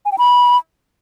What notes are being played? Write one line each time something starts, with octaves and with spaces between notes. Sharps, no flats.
G#5
G5
B5